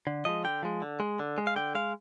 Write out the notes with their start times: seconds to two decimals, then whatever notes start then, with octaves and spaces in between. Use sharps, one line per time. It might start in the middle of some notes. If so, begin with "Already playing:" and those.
0.07 D3
0.25 F3 G#3 D#5
0.44 D3 G5
0.63 F3 G#3
0.82 D3
1.00 G#3
1.19 D3
1.38 G#3
1.47 F5
1.56 D3 G5
1.75 G#3 F5